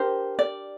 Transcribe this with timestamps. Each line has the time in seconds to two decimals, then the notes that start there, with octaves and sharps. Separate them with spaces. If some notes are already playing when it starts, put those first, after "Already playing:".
Already playing: D4 G4 A#4 C5
0.39 D5